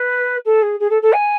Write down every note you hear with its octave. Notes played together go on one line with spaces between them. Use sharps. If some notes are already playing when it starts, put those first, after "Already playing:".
Already playing: B4
A4
G#4
G#4
A4
A4
G#5